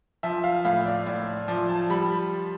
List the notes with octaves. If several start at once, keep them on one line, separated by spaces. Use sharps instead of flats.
F3 E5
F5
A2 F5
D5
A2 D5
F3 D5
A5
G3 B5